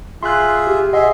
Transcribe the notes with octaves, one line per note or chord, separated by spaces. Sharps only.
F4 G#4 E5 C6 F#6
G4
G#4 D#5 E5 F#5 C6